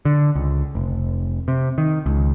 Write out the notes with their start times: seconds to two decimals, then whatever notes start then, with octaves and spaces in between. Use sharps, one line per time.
0.05 D3
0.35 C#2
0.75 F1
1.48 C3
1.78 D#3
2.06 C#2